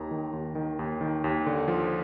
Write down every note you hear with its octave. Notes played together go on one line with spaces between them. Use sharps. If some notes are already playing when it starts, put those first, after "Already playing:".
Already playing: D#2 D#3 A#5
D#3
D#2
D#3
D#2
D#3
D#2
D3
F3